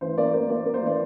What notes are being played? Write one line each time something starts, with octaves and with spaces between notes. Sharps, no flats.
E3 C5
A#3 D5
A#3 C5
A#3 D5
A#3
C5
E3 D5